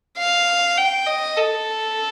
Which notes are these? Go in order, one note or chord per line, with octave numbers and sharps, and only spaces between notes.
F5
G5
D#5
A4